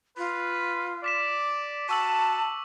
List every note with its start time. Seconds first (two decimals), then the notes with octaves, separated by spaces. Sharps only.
0.17 F4 B4
1.04 D5 D6 B6 E7
1.89 F#4 A5 C#6 E6 F#7